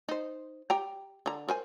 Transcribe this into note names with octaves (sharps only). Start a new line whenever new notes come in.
D#4 C5
G4 G5 A#5
D3 A#5
A#4 C5 G#5